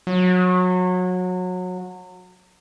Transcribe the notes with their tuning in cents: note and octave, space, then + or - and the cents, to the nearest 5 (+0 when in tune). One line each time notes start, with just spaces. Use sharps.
F#3 -25